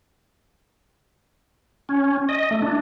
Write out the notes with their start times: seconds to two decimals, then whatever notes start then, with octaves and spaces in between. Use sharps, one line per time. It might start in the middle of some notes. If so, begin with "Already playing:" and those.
1.89 C#4
2.29 D#5
2.51 A3
2.62 D4